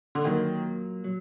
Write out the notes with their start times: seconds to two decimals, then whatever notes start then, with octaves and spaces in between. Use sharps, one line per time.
0.15 D3
0.24 A#2 D#3 F#3 A#3
1.04 F#3